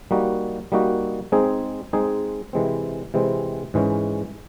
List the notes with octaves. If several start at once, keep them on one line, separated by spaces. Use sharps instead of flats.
G3 A#3 D#4 F#4
G3 A#3 D#4 F#4
G#3 C4 D#4 G#4
G#3 C4 D#4 G#4
C3 E3 G#3 C4
C3 E3 G#3 C4
G#2 E3 G#3 C#4